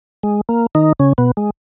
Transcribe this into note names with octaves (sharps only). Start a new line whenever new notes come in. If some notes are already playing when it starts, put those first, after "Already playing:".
G#3
A#3
D#3 D#4
C#3 C#4
B2 B3
G#3